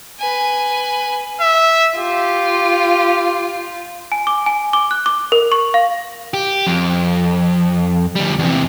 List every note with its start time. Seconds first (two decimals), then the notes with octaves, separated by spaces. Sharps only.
0.19 B4 G#5
1.41 E5
1.97 F4 G4
4.12 G#5
4.27 D6
4.46 G#5
4.73 D6
4.91 F#6
5.06 D6
5.32 A#4
5.52 C#6
5.74 F5
6.34 G4
6.67 F2
8.16 D2 G3
8.39 E2 C3